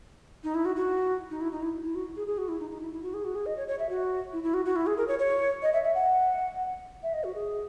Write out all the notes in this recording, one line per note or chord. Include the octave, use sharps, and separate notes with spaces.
D#4
E4
F#4
F#4
D#4
E4
D#4
E4
E4
F#4
G#4
G#4
F#4
E4
D#4
D#4
E4
E4
F#4
G#4
F#4
G#4
D#5
C#5
C#5
E5
F#4
E4
E4
F#4
F#4
E4
G#4
A#4
C#5
C#5
D#5
E5
E5
F#5
E5
D#5
F#4
G#4